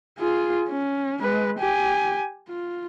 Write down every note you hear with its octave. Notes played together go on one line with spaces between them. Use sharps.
F4 G#4
C#4
G#3 B4
G4 G#5
F4